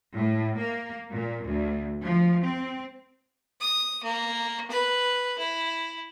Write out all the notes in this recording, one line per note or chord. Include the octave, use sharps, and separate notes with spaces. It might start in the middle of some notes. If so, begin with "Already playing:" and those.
A2
A#3
A#2
D2
F3
C4
D#6
A#3
B4
E4